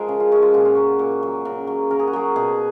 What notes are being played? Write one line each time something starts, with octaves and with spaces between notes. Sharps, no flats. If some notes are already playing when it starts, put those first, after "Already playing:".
Already playing: F3 G#3 G#4 A#4
C#3
F4
F3 G#3 C#4
F4
A#2 F#4
F4
F#3 F#4
A#2
F#3
C#3 A#4
F#3
C#3 A#4
G#4
F#4
F#3 G#4
B2 G#4